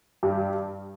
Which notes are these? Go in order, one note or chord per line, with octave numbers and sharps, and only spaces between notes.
G2 G4